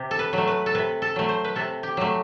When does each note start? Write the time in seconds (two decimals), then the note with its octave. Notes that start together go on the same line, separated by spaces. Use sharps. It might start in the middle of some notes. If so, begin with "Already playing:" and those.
Already playing: C3 G4
0.11 A4
0.19 B4
0.33 F#3 A3
0.48 B4
0.66 A4
0.75 C3 B4
1.02 A4
1.16 F#3 A3
1.29 C5
1.45 B4
1.56 C3 A4
1.83 G4
1.97 F#3 A3